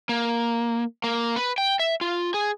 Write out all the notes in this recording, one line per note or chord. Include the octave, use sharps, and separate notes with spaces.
A#3
A#3
B4
G5
E5
F4
G#4